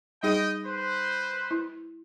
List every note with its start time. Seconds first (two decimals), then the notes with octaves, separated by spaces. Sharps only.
0.23 G3 D#4 G#4 D#5 G5
0.65 B4 C5
1.51 E4